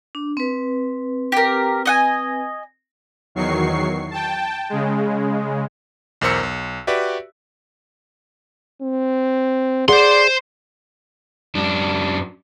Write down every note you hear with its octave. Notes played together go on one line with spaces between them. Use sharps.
D4
C4 B4
G4 A#4
D#5 F#5 G#5
E2 D#3 F#3 C#6 C7
G5 A5
C#3 G#3
B1 E2 A#4 C5 E6 C#7
B1
F#4 G4 B4 D5 E5
C4
G#4 C5 D5 F#5 C6
F#2 D4